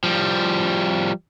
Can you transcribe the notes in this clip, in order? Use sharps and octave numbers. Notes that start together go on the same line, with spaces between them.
F3 G3